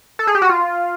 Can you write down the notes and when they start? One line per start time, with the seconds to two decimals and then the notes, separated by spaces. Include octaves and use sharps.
0.19 A4
0.27 G#4
0.35 G4
0.42 F#4
0.49 F4